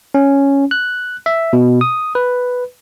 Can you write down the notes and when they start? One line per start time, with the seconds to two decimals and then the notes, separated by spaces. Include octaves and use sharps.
0.14 C#4
0.71 F#6
1.26 E5
1.53 B2
1.81 D#6
2.15 B4